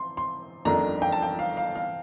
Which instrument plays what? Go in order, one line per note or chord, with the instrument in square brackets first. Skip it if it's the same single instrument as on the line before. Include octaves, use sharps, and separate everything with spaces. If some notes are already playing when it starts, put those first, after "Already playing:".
Already playing: [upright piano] C6
C6
[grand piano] G1 F2 D#3 A3 D4 [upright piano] A#5
[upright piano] G5
A5
G5
F5
F5
F5